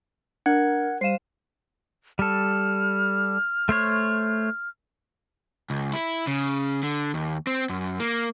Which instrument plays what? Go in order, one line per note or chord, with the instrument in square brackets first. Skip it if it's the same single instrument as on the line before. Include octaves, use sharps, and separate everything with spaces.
[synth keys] D4 [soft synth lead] A#4 [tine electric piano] F#5 [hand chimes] G#6
[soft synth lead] G3 [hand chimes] C5 F5 [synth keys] C7 D#7 E7
[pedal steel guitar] G3 A4 [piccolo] F6
[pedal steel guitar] A3 C5 C#5
[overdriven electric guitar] C#2
E4
C#3
D3
D#2
C4
F#2
A#3